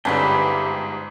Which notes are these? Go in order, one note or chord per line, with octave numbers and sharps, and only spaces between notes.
G1 G#2 A3 C#4 D4 G4 B4 G5